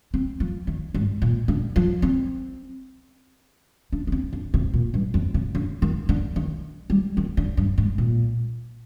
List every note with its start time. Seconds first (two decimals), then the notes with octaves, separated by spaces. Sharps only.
0.14 C4
0.40 F3
0.67 D#3
0.94 G#2
1.22 A#2
1.48 D3
1.76 F3
2.02 C4
3.92 D4
4.07 D4
4.12 C4
4.33 D3
4.54 C3
4.74 A#2
4.94 G2
5.14 F2
5.34 C3
5.55 D3
5.82 D#3
6.09 D3
6.36 D#3
6.90 G3
7.17 D#3
7.37 D3
7.57 G2
7.78 G#2
7.98 A#2